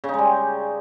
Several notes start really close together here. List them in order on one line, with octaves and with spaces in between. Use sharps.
C#3 D#4 G#3 G3